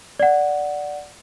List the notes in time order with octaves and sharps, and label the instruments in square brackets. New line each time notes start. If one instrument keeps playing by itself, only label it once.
[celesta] D5 F#5